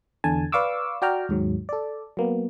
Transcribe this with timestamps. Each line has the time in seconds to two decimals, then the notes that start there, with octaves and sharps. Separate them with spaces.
0.24 E2 D3 G#5 A5
0.52 B4 D5 F5 C#6 D6 E6
1.02 F#4 D5 G5 A#5 F6
1.29 D#2 G#2 F#3
1.69 A4 D5
2.17 F#3 A#3 B3